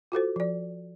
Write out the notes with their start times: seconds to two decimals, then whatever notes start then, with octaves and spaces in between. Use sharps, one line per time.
0.12 F4 F#4 A4 C5
0.36 F3 D5